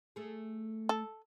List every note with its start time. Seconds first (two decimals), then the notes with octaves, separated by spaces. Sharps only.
0.16 A3 G#4
0.89 A4